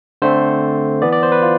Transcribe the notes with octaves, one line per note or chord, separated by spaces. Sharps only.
D3 A3 C4 C5
E3 B3 D5
D5
C5
B4
F4